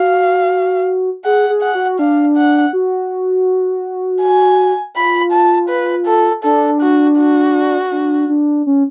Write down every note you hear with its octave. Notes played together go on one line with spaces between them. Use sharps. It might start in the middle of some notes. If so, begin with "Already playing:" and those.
Already playing: F#4 F5
G#4 F#5
G#4
F#5
F#4
D4 F5
F#5
F#4
G#5
F4 B5
A5
B4
A4
D4 A4
F#4
F#4
D4
D4
C#4